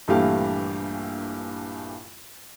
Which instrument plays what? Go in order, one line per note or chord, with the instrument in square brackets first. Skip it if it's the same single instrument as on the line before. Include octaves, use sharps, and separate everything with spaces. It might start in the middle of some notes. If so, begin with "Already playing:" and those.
[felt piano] A#1 G2 E3 A3 G4 F5